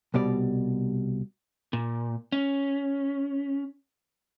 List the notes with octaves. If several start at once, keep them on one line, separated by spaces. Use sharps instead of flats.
C2 B2 G3 D5
A#2
C#4